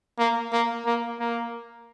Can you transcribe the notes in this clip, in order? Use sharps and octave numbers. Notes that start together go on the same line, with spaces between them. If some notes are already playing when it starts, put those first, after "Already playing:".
A#3
A#3
A#3
A#3